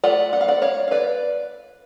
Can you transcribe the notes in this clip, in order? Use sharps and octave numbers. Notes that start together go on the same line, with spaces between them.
A3 F4 D5 F#5
F#5
F5
D5 F#5
C#5 F5
F5
B4 D5